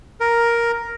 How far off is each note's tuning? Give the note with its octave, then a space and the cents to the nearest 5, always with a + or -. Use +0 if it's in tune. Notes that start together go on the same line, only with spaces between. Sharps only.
A#4 +5